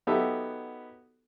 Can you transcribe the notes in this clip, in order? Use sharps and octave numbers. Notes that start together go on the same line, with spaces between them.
F#3 B3 D#4 G4 A4 E5